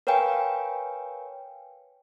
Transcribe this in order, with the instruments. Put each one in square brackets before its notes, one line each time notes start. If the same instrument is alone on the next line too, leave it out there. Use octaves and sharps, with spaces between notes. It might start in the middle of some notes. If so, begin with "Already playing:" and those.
[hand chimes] A#4 B4 C#5 F5 G5 G#5